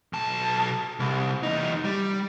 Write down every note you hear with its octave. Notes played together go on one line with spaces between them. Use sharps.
B1 A5
C2
E2 D#4
G3